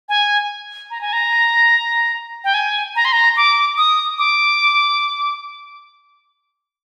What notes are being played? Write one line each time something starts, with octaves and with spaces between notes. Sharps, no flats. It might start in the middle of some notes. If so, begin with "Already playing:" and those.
G#5
A#5
G#5
A#5
G5
G#5
A#5
C6
A#5
D6
D#6
D6